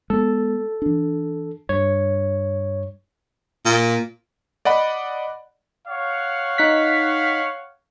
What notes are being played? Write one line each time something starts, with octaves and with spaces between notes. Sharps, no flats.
G#3 B3 A4
E3 D4
G2 C#5
A#2
D5 D#5 F#5 B5
C#5 F5 F#5
D#4 F#6 B6